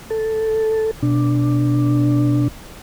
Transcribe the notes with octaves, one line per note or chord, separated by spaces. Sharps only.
A4
B2 D4